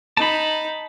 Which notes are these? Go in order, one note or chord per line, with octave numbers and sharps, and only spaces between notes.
D#4 A5 B5